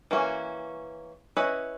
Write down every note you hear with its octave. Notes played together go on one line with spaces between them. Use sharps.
E3 A#3 C#4 F#4
C#4 E4 B4 D#5